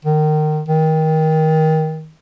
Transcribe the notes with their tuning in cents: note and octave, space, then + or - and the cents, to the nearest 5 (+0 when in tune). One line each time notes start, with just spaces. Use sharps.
D#3 -25
D#3 +20